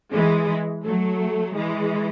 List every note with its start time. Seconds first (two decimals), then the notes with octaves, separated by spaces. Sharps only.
0.13 E3 G#3
0.85 F#3 A3
1.57 E3 G#3